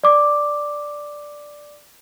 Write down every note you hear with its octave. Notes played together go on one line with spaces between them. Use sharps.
D5 D6